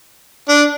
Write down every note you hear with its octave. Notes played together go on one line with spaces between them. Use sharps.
D4